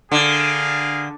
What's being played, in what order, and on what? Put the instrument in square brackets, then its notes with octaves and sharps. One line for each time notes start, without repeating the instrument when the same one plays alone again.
[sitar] D3 [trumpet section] G#4 A#4 F5